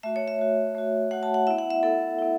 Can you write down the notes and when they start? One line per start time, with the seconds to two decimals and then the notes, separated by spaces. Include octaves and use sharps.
0.03 A3 F#4 E5
0.16 C#5
0.28 E5
0.39 A3 F#4
0.75 A3 F#4
1.11 A3 F#4 F#5
1.23 A5
1.34 F#5
1.47 B3 E4 E5
1.59 F#5
1.70 E5
1.83 B3 E4 A4
2.19 B3 E4